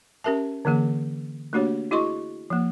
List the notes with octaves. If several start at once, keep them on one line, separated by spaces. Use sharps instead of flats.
C#4 G4 A#4 E5 A5
D3 E3 A#3 G#4
A3 A#3 D4 F#4 G4 C#5
E4 F#4 G#4 D#5 C6 C#6
F3 A#3